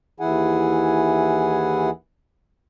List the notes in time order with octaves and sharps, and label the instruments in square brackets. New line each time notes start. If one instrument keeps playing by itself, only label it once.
[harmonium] D#2 E3 E4 G#4 F#5 G#5